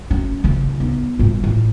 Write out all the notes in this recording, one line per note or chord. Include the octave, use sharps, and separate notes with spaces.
F#3 C#4
C#2 C#3
B3 D#4
G2 A#2
A1